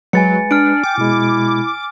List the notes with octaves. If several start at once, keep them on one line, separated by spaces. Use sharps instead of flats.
F#3 G#3 B4 G#5 A6 C#7
D4 F6 D7
G5 D6
B2 G#3 E4